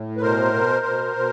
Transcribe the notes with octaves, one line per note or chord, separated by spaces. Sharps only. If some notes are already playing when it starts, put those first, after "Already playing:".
Already playing: A2
B4
B2 A#4 C5
B2
B2
B2